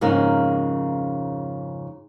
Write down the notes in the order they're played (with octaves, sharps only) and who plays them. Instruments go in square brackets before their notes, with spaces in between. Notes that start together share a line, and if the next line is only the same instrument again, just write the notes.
[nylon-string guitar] F2 G#2 C#3 A#3 D#4